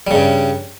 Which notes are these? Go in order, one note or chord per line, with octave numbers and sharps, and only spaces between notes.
G2 C#3 G3